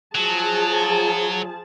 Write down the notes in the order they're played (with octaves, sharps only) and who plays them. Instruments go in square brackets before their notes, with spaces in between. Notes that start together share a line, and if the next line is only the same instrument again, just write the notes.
[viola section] F3 G#4 A5 [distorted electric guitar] F#3